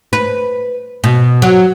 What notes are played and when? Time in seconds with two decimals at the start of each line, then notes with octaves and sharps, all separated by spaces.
0.13 B4
1.04 B2
1.42 F#3